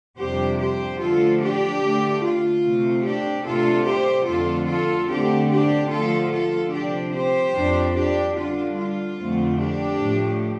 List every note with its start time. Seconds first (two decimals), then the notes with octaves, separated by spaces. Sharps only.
0.18 F2 C3 G3 D4 G4 C5
0.59 G4 C5
1.00 D3 F3 A3 F4 A4
1.41 D4 G4
1.81 D3 A3 D4
2.22 F4
2.64 C3 A3 C4
3.05 D4 G4
3.45 C3 A3 D4 F4 A4
3.86 G4 C5
4.27 F2 D3 A3 D4 F4 A4
4.67 F4 A4
5.08 D3 A3 C4 D4 G4
5.50 D4 G4
5.90 D3 F3 A3 F4 A4
6.31 F4 A4
6.72 C3 F3 C4 D4 G4
7.13 G4 C5
7.54 F2 F3 D4
7.94 D4 G4
8.35 D3 G3 D4 F4
8.76 F4
9.17 F2 D3 A3 C4
9.58 D4 G4
9.98 A2 F3 A3